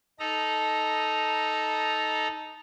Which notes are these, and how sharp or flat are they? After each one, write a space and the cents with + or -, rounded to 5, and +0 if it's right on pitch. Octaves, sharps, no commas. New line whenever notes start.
D#4 +0 A4 -10 A#5 +0